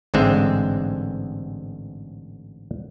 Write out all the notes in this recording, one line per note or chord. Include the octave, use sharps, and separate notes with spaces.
A1 G#2 D3 G#3 C4 E5